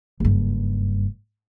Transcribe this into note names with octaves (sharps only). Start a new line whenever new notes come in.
F#1 G2